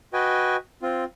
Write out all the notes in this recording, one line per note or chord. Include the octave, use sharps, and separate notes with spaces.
F#4 B4 D#5 G5 G#5
C4 F4